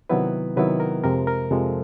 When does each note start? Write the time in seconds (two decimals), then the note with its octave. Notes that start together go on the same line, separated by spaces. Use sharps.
0.09 C3 D#3 F#3 B3 E4 B4
0.57 C3 D#3 F#3 B3 E4 B4
0.80 A#4
1.04 F2 C3 F3 G#3 A#4
1.27 A#4
1.51 F2 C3 F3 G#3 A4